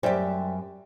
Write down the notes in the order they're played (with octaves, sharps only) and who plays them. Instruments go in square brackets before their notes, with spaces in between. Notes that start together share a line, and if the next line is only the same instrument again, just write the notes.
[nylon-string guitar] F#2 E5 [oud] G3 G4 [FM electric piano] C5